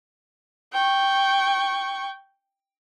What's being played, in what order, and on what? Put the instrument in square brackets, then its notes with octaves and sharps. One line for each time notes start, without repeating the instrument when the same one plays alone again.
[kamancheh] G5 C#6